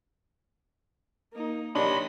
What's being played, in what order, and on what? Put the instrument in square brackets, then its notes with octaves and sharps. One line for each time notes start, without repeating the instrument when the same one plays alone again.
[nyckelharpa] A#3 D#4
[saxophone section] D#3 C#5 [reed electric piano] D4 G4 [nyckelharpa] D#5 [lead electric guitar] B5 C6